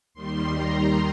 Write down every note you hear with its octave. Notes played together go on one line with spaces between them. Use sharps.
D#2 D#3 G3 C6
A#5